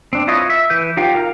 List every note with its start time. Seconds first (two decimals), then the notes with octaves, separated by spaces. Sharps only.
0.13 C4 D4
0.27 E4 F4 B4 C#5 D#5
0.50 E5
0.70 E3 B4 G6
0.97 F#3 D#4 F4 G4
1.15 A#4 F5 A#5 F6